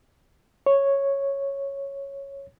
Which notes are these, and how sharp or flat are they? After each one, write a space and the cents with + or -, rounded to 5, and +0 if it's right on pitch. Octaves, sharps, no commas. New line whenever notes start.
C#5 -5